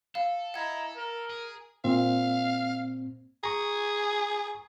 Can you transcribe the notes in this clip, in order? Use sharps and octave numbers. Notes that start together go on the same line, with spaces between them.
A4 F5
E4 D#5 F#5 A#5 G#6
A#4
G#4
A#2 C4 F5
G#4 A#5 C#6